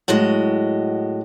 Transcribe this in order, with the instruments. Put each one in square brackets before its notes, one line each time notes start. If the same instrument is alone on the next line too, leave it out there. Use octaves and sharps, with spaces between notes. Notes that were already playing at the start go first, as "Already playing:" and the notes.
[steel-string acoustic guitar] A2 F#3 G#3 F#4 D#5